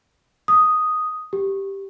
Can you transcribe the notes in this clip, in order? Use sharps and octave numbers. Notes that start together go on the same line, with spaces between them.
D#6
G4